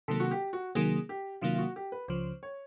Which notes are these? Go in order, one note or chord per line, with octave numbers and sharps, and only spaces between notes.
C3 D#3 F#3 A#3 A4
F#4
G4
F#4
C3 D#3 F#3 A#3 G#4
G4
C3 D#3 F#3 A#3 F4
F4
F#4
G4
B4
C#2 C#3 F3 C5
C#5